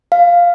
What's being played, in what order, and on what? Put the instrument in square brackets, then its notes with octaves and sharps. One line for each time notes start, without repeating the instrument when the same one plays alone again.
[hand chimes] F5